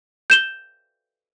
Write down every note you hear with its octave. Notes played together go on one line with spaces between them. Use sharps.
G6 E7 G7